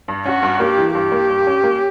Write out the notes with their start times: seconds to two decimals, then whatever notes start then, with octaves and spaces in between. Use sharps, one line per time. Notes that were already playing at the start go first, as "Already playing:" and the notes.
0.08 G2
0.25 C#4 F#4
0.43 G2
0.60 A#3 G4
0.78 E3
0.95 G2 G4
1.12 A#3
1.30 G2
1.47 C#4
1.64 A#3